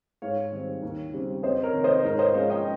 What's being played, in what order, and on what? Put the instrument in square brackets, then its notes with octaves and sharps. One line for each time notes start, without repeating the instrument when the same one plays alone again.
[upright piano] G#2 C#5 F5
D#3 G3 C4
D#2
C#3 G3 C4
F2 C5 D#5
A#4 C#5
C3 D#3
C5 D#5
G#2 A#4 C#5
C5 D#5
F3 G#3 C#4 C#5 F5
D#5 G5